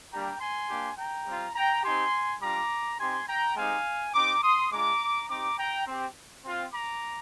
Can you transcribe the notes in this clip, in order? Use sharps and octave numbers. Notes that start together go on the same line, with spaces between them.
G3 A#3 D4 G4 G5 A#5
G#5 C6
A#3 D4 G4
G5 A#5
G3 C4 F4
G5 A#5
C4 D#4 G4 G#5 C6
G3 D4 F4 A#5 D6
C4 D#4 G4 G#5 C6
G5 A#5
G#3 C4 D#4 G4 F5 G#5
C4 D#4 G4 A#5 D6
C6 D#6
G#3 D4 F4 A#5 D6
C4 D#4 G4 A#5 D6
G5 A#5
C4 G4
C4 F4
A#5 D6